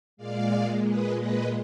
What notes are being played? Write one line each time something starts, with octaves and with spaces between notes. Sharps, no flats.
A#2 G#3 D5 F5
B4 D#5
B4 D#5